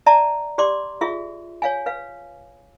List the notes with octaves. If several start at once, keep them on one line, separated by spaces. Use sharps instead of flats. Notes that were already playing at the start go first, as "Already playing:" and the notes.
D5 E5 A5 A#5
G4 D5 C6 D6
F4 G#4 E5
C#5 F5 G#5
B4 F5